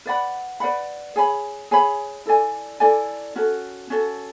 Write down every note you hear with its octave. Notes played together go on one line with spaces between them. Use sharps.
B4 D5 F#5 B5
B4 D5 F#5 B5
G#4 C#5 G#5 B5
G#4 C#5 G#5 B5
E4 A4 D5 G#5
E4 A4 D5 G#5
C#4 F#4 A4
C#4 F#4 A4